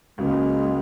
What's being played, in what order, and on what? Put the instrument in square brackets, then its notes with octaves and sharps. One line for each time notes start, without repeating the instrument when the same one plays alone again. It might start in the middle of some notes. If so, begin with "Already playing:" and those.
[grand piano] C#2 C#3 F#3 A#3 [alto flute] G#3